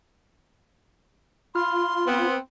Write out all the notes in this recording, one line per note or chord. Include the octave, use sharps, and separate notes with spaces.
F4 B5 C6 F6
B3 C4